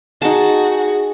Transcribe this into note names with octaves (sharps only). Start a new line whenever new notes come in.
D#4 F#4 G#4 A5